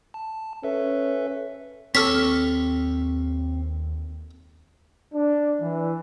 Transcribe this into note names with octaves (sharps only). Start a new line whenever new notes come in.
A5
C#4 A4 B4 E5
D#2 C4 A4 C#5 D6 F6 B6
D4
E3